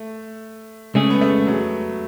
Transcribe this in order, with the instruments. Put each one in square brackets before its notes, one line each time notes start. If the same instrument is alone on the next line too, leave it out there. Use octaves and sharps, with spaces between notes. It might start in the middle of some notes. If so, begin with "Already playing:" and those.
Already playing: [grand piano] A3
[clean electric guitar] C#2 C#3 G#3 C#4 G#4 [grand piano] A3
[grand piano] B3
A3
F#3